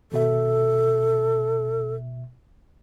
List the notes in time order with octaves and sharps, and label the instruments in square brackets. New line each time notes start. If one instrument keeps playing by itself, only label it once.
[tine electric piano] G#1 B2 E5 [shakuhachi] A4